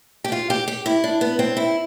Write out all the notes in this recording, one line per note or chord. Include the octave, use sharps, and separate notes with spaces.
G4
F4
G4
G4
E4
D4
B3
C4
E4